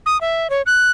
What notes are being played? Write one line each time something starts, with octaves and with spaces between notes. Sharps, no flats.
D#6
E5
C#5
F#6